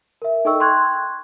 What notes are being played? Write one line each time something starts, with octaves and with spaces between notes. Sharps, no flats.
A#4 E5
D#4 A4 D#5 G5 C#6 E6
G5 C6 C#6 F#6 G#6